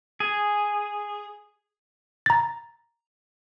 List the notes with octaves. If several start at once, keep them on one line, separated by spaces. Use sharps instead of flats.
G#4
A#5 A6